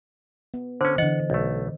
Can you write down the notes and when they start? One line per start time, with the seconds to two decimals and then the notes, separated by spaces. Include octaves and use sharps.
0.54 B3
0.81 D3 C#4 C5
0.98 D3 E3 D#5 F#5
1.30 B1 A3